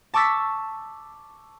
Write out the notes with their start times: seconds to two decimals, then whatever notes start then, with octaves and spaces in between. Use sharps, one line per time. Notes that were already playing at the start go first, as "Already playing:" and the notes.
0.14 A5 C#6 D6 E6 A6 B6